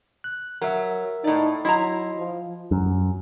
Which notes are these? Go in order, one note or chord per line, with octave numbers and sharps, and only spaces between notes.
F#6
F#3 A#4 E5
A2 D#4 D5
F#3 E4 D#5 A#5 C6
F3
F#2